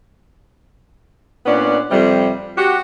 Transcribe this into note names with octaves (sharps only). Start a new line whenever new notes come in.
A#2 B3 C#4 D4 D5
F2 C3 G3
F#4 G4